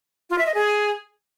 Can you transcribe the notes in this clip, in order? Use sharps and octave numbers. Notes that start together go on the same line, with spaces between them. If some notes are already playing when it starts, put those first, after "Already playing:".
F4
E5
D#5
G#4